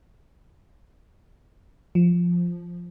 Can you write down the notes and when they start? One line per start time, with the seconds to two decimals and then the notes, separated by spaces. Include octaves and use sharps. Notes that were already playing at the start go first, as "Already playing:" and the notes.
1.95 F3